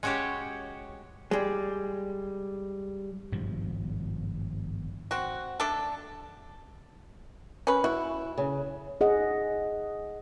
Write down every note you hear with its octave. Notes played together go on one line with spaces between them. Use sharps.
G#3 C#4 F#4 G4 C#5
G3 G#3
G#1 G2 B2 F3
C4 F#4
A3 D4 A4
C#4 B4
E4 F#4
C#3
G#4 D#5 F#5